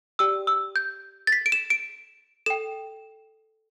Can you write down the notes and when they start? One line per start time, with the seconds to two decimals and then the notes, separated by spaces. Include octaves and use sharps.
0.19 G4 D5 G5 E6
0.47 E6
0.76 G6
1.27 A6
1.32 B6
1.46 D7
1.52 E7
1.70 D7
2.46 A4 G5 E7